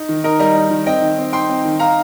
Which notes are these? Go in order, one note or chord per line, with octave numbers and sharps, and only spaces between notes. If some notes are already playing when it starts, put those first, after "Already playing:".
Already playing: D#4
D#3
D#4 A#4 D#5
G3 A#4 D#5
D#4
D#3
C4 D#5 G5
D#3
C4
D#4 G5 C6
C4
D#3
D#4 F5 A#5